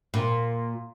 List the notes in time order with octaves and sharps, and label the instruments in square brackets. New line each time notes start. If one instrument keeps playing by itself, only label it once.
[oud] A#2